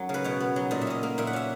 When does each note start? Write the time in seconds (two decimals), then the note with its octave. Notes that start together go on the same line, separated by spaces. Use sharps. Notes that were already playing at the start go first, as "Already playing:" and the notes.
Already playing: F#2 F#3
0.09 C#3
0.14 B4
0.24 B2 C#5
0.40 B3
0.56 F#3
0.71 A#2 D#5
0.81 E5
0.87 C#4 D#5
1.03 A#3
1.18 A#2 E5
1.27 F#5
1.33 C#4 E5